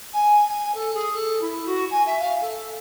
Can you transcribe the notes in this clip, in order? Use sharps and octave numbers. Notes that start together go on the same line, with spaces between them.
G#5
G#5
A4
G#4
A4
E4
F#4
G#5
E5
F5
A4